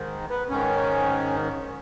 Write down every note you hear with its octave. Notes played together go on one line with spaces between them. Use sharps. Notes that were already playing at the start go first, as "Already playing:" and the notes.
Already playing: G#2 D#3
B3
G#2 D#3 C#4